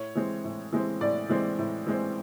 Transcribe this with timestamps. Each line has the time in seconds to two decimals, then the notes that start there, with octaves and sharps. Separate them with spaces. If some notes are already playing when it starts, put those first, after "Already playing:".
Already playing: A2 C#5
0.15 E3 G#3 C4
0.44 A2
0.73 E3 G#3 C4
1.01 A2 D5
1.29 E3 G#3 C4
1.58 A2
1.87 E3 G#3 C4